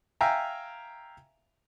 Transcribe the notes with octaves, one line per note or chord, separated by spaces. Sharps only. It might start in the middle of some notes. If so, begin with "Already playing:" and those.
E5 F5 G5 G#5 A#5